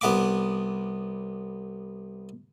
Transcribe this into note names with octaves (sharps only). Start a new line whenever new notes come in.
C2 B3 F#5 B5 D6